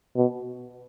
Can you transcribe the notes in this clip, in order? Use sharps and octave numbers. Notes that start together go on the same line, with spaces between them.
B2